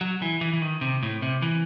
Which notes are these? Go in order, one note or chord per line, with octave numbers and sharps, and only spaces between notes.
F#3
E3
E3
E3
D#3
C3
A2
C3
E3